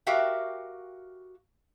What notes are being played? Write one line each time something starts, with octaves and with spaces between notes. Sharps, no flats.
F#4 G4 A#4 E5 F5 G5